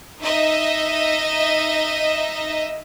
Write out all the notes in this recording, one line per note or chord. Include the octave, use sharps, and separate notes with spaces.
D#4 D#5 E5